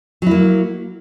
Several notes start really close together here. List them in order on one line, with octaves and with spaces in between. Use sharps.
F#3 E4 A#3